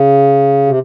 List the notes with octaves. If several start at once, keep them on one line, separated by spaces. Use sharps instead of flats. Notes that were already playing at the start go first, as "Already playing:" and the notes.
Already playing: C#3
C3